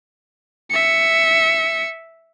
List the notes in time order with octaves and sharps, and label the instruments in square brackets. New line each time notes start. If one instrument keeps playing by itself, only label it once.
[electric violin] E5 C#7